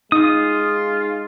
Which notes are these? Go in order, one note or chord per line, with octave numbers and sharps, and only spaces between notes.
G#3 D#4 F4 D#6